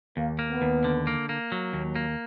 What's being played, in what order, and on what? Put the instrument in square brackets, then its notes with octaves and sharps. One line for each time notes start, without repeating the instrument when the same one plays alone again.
[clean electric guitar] D#2 [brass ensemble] A#3
[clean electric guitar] A#3
[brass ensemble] B3
[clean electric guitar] D#2
D3
A#3
A#3
F#3
D#2
A#3